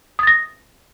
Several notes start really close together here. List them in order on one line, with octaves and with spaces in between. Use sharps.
D#6 A6 A#6